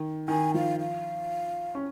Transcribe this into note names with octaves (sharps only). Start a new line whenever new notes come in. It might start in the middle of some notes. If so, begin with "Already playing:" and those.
Already playing: D#3
D#3 G#5
F3 F5
F5
C#4